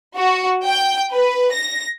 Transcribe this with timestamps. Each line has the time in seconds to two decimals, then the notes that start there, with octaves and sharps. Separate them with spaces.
0.17 F#4
0.65 G5
1.13 B4
1.54 A#6